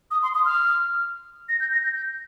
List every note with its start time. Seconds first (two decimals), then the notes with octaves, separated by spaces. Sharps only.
0.11 D#6
0.23 C6
0.35 D#6
0.45 F6
1.49 A#6
1.60 G6
1.72 A#6
1.83 G6
1.94 G6